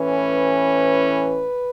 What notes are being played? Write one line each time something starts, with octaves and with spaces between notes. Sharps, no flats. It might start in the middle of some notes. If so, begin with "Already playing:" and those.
Already playing: A2 E3 C#4 B4